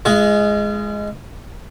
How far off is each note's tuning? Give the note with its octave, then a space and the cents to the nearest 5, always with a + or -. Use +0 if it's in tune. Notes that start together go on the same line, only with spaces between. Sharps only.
G#3 +0 F4 -40